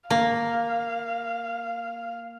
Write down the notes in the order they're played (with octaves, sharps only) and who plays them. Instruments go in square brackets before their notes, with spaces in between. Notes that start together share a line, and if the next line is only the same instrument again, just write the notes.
[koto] A#3 [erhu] F5